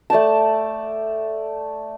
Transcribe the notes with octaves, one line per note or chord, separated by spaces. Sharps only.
A3 D5 G5 A5